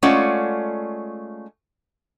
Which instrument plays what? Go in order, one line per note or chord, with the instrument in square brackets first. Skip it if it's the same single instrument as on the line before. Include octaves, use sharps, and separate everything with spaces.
[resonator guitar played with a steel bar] G#3 A3 C#4 F4 D5 F#5